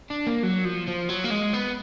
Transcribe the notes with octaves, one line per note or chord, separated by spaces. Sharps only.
D4
A#3
F#3
F3
F3
F#3
A#3
G#3
B3